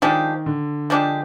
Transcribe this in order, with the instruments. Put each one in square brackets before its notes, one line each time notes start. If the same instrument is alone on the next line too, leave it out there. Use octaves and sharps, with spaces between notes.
[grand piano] D#3 [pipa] F3 G#3 D4 G4
[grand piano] D3
[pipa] F3 G#3 D4 G4